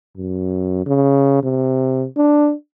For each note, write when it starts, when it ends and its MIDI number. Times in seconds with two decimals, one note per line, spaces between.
0.17 0.86 42
0.86 1.42 49
1.43 2.06 48
2.17 2.53 62